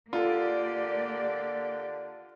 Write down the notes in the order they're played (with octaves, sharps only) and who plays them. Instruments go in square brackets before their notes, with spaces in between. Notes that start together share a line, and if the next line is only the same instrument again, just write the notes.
[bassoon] D3 [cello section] A#3 G4 D5 [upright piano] F4 A4